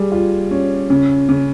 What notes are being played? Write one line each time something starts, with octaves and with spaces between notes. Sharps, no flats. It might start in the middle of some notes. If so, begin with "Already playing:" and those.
Already playing: G3 G#4
F4
C#4
C#3
C#3